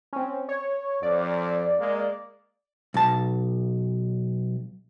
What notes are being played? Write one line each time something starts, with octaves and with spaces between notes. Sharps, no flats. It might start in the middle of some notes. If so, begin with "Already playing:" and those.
C4 C#4
C#5
F2 D5
G#3 A#3
B1 A5